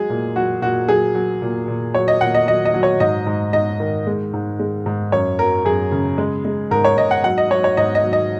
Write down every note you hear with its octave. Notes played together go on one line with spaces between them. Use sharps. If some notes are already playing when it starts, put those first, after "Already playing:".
Already playing: F#3 G#3 G#4
A#2
F#3 F#4
A#2 F#4
F#3 G#4
F#3
A#2
A#2
F#3 C#5
D#5
A#2 F#5
D#5
F#3 D#5
D#5
F#3
C#5
G#2 D#5
G#2
G#2 D#5
D#3
G#3
G#2
G#3
G#2
F#2 C#5
F#3 A#4
F#2 G#4
C#3
G#3
G#3
G#2 A#4
C#5
G#2 D#5
F#5
F#3 F#5
D#5
F#3 C#5
C#5
G#2 D#5
D#5
F#3
D#5